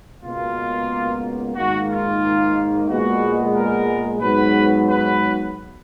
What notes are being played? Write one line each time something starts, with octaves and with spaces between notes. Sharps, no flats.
C#2 B2 A#3 F4
G#2 D#3 A#3 F#4
F4
A#2 G#3 B3 F#4
A#4
G#2 F#3 B3 B4
B4